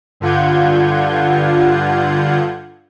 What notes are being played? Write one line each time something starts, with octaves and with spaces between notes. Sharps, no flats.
G2 D3 F4 F#5 G6 G#6